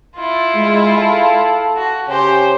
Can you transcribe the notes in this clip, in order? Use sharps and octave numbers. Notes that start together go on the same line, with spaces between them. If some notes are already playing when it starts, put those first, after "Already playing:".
E4 F4
G#3
A4 F5 A5
F#4
C#3 G4 C5 C#5 G#5